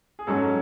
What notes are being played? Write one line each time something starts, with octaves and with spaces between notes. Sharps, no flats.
G#4
G#2 F#3 C#4 A4